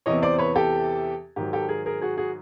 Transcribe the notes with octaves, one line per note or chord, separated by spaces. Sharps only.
E2 C3 E3 C#5 D#5
C5 D5
B4 C#5
G4 A4
G#2 D#3 F#3 G4
G4 A4
G#4 A#4
G#4 A#4
F#4 G#4
F#4 G#4